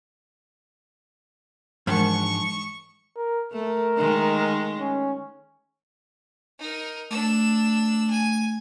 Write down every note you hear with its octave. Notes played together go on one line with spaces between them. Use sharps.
G#2 E3 F3 G#3 D4 A#4 A5 C#6
A#4
A3 A#4
D#3 G#3
C#4
D#4 A#4
A3 D4 E6
G#5